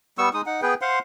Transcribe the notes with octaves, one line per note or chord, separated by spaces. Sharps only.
G3 B3 C#6 E6
G#3 D#4 D#6
D#4 F#5
B3 G#4 B4 G5
C5 F5 F#5 C6